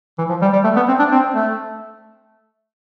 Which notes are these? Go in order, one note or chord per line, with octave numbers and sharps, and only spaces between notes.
E3
F3
G3
G3
A3
B3
C4
D4
C4
A3